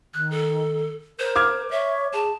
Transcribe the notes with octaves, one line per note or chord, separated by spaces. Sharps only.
D#3 F#6
A4
A#4 C5
D6 F6 G#6
C#5 E5
G#4 A5